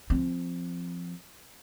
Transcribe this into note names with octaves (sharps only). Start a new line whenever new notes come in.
F3 C4